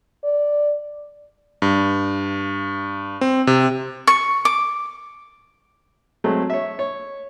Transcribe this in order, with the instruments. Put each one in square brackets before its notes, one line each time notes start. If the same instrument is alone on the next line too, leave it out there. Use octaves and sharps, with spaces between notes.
[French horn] D5
[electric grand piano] G2
C4
C3
[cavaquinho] C#6
D6
[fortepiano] F#3 G#3 A3 C4
C#5 E5
C#5